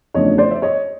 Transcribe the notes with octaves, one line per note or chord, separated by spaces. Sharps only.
E2 C#3 F3 A3 D4 C#5 D#5
C5 D5
E5
C#5 D#5